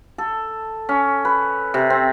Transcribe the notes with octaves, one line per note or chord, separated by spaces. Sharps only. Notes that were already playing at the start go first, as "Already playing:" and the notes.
A4
C#4
B4
C3
C4